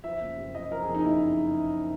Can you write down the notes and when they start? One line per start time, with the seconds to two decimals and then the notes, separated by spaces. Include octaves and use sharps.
0.04 F3 E5
0.21 F#1
0.38 C3
0.55 F3 D#5
0.71 F3 A#4
0.82 G#4
0.89 F2
0.94 D#4
1.05 F#1 E4